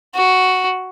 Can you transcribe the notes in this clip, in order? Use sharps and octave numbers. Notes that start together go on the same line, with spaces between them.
F#4